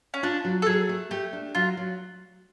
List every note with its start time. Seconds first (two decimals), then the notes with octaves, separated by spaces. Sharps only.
0.14 C#4
0.23 D4 F4
0.45 F#3
0.62 A4
0.66 F#3 G#4
0.89 A3
1.11 A3 G4
1.33 D4
1.55 F#3 F4
1.77 F#3